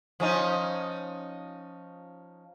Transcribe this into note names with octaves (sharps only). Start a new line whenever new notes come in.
F3 C#4 D#4